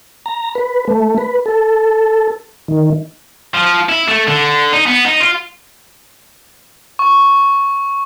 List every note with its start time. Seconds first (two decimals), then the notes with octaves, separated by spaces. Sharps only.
0.26 A#5
0.55 B4
0.88 A3
1.18 B4
1.46 A4
2.68 D#3
3.54 F3
3.89 E4
4.08 A3
4.28 D3
4.73 D#4
4.86 B3
5.06 D#4
5.20 F4
6.99 C#6